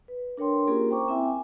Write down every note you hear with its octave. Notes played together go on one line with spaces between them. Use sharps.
B4
D4 A#4 C#5 G5 C6
A#3 C#4 F4 G4 G#4 A#4
C5 G5 A#5 C#6 D6
C4 E4 E5 G5 G#5
G#5